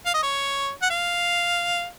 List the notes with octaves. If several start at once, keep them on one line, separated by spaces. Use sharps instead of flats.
F5
D#5
C#5
F#5
F5